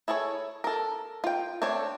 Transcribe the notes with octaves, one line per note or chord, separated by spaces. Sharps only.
E4 G#4 A4 C#5
A4 A#4
F4 G5
A3 C4 D4 C#5